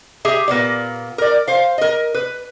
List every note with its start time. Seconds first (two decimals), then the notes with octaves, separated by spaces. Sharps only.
0.25 G4 G#4 E5
0.48 A#2 A#3 B3 D5
1.18 A#4 D5
1.48 C5 F5
1.78 A#4 D#5
2.15 B4